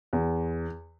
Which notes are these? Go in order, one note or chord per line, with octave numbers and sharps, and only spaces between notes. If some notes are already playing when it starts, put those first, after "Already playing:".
E2